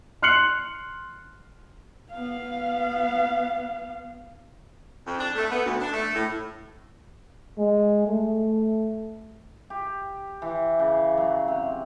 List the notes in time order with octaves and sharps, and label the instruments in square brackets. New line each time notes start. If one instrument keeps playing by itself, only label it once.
[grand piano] C6 F6 F#6 C7 C#7 F#7
[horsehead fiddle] B3 F5
[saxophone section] F2
D4
A3
B3
D2
D4
A3
A2
[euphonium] G#3
A3
[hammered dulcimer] G4
E3
C#3
F#3
C3